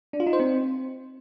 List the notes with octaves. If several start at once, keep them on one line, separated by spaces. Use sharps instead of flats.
D4
F4
D#4
C5
C4